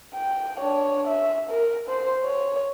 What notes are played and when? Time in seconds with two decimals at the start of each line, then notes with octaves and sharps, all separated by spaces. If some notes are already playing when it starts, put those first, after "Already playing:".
0.14 G5
0.60 D4 C#5
1.08 E5
1.49 A#4
1.88 C5
2.24 C#5